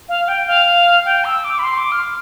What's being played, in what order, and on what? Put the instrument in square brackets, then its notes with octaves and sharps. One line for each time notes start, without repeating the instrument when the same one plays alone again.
[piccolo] F5
G5
F5
G5
E6
D6
B5
C6
D6
F6